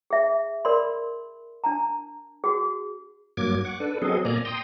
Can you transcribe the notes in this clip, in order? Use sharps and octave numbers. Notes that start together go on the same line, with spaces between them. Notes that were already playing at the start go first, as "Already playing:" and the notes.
G#4 E5
A#4 D5 B5 C6
D4 A5 A#5
F#4 G#4
G2 F#3 A#3 D6 G#6
F#5 C#6 D6
D4 A4 B4
F#3 B3 C4 G#4 A4 D#5
A#2 A#3 D5 G#5 A#5
G5 A#5 C6 D#6